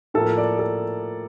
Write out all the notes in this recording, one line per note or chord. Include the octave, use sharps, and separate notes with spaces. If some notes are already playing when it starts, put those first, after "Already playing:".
A2 F3 A#3 A4
D5
A4